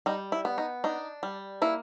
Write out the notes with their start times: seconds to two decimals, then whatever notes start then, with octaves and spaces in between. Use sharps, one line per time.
0.06 G3 D#4
0.32 E4
0.45 B3
0.58 D#4
0.84 D4 D#4
1.23 G3
1.62 A#3 E4